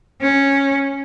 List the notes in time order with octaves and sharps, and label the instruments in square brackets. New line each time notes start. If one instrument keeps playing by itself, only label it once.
[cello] C#4